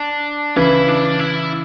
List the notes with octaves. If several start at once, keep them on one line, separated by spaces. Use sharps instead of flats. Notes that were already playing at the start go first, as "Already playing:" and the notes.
Already playing: D4
C#3 E3 E4
D4
E4